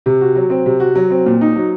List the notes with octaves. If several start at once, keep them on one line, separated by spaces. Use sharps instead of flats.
C3
F#4
F#3
C4
C3
F#4
F#3
C4
A#2
D#4
F#3